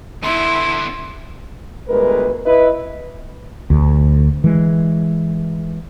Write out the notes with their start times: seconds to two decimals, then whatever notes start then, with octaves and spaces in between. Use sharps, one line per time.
0.24 D3 B3 E4 C6
1.88 G1 D2 G#3 A#4 B4
2.45 E4 B4 D#5
3.70 D2
4.44 E3 G#3